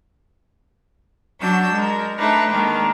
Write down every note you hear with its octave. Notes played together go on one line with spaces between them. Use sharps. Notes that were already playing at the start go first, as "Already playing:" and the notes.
F#3 D4 F#4 E6 G6
G#3 A#4
A3 D4 D#4 B4
D#3 G#3 A#3 D4